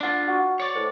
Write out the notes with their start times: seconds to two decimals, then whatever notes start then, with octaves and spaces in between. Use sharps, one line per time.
0.01 D4 F4 E5 F#5 A5
0.28 F#4
0.60 C#5 D5
0.75 A2 C5